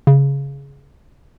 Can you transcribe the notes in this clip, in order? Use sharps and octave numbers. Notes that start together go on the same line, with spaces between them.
C#3